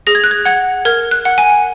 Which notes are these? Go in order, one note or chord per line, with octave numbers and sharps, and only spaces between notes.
G#4 A#6
G#6
F#6
G#6
F#5 G#6
A#4 G#6
F#6
F#5
G#5